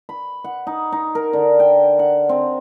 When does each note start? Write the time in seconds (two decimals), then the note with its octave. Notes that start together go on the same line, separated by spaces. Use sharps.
0.09 B5
0.44 F#5
0.67 D#4
0.92 D#4
1.15 A#4
1.33 D3
1.59 G5
1.99 F#5
2.29 C4